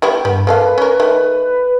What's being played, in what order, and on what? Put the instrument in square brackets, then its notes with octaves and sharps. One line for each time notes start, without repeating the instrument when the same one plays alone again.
[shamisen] G3 B3 E4 [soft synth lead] G5
[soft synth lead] G2 [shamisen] B3
[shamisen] A#3 A4 F5 [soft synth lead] B4
[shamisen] C#4 A#4
D#3 A3